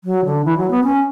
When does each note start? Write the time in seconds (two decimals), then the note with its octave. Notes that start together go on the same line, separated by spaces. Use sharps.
0.04 F#3
0.25 D3
0.45 E3
0.57 F#3
0.70 B3
0.84 C#4